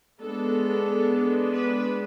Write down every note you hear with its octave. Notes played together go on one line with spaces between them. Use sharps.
G#3 B3 D4 A4
B4